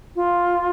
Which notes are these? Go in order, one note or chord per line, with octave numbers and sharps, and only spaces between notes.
F4